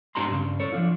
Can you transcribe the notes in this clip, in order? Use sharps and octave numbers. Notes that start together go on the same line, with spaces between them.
G#2 D4 G4 A5 A#5 C6
G2 C#3
A4 C#5
F3 D4 F4